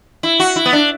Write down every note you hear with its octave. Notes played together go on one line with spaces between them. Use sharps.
E4
F#4
E4
B3
D4